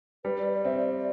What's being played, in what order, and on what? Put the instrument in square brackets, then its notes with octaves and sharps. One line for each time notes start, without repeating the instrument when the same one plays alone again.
[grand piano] G3 [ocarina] B4
[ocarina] D5
D5
[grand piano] C4 [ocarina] E5
[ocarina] D5
D5